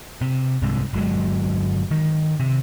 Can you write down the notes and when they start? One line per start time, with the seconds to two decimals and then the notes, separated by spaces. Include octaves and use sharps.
0.21 C3
0.62 C2 G#2 C3
0.93 G1 F#3 G#3
1.91 D#3
2.40 C3